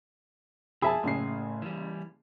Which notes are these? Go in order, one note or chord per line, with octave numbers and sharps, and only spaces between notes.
F2 B2 F3 G#4 E5 G#5 A5 B5
F#1 A2 C#3 C7
E3 G3